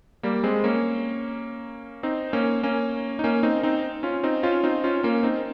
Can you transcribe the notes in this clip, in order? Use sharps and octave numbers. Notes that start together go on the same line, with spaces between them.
G3 A#3
G#3 C4
A#3 C#4
C4 D#4
A#3 C#4
A#3 C#4
D#4
A#3 C#4
C4 D#4
C4 D#4
C#4 F4
C4 D#4
C#4 F4
C4 D#4
C#4 F4
A#3 C#4
C4 D#4